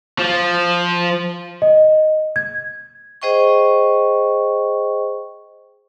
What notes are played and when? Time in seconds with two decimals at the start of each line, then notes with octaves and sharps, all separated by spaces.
0.19 F3
1.62 D#5
2.36 G#6
3.22 G#4 C5 D#5 G5 C#6